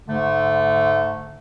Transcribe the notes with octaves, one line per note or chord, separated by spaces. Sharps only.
G#2 D3 A3